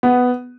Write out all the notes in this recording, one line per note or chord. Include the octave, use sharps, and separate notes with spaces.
B3